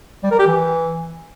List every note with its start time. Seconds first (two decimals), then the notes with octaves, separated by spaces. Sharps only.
0.23 G3
0.31 A#4
0.39 G4
0.46 E3